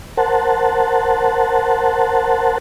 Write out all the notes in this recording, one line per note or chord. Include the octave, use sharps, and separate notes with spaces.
A#4 C5 F#5 A5